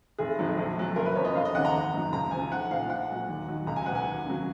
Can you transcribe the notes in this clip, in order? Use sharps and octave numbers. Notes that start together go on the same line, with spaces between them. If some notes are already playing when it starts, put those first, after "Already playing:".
F1 G#4
F2 D#3 F#3
A#1
A#2 F#3
F#1 A#4
B4
F#2 F3 C#5
D#5
F1 F5
D#5
D#2 C#3 F#5
A#5
G#1
F#2 D#3 F#3
C#2 A#5
C#3 F3 G#5
B1 F#5
A#2 F3 F5
A#1 F#5
A#2 F#3
D#2
D#3 F#3
C#2 A#5
G#5
B2 F#3 F#5
G#5
D#2
C#3 F#3